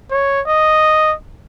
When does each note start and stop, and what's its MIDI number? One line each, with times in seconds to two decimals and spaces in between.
0.11 0.41 73
0.47 1.14 75